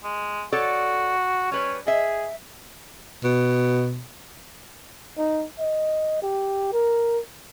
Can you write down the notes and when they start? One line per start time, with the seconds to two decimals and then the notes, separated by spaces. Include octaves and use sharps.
0.04 G#3
0.53 F#4 A4 C#5 D5
1.51 G3 C#4 B4 C#5
1.87 G#4 D#5 E5
3.24 B2
5.18 D#4
5.59 D#5
6.22 G4
6.72 A#4